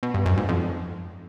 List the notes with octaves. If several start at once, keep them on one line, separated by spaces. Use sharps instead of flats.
B2
G2
F#2
G#2
F2